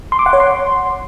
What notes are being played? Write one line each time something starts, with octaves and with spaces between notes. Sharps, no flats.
C6
D6
F#5
C#5
C6